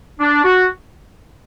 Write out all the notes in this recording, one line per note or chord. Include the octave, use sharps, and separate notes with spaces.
D4
F#4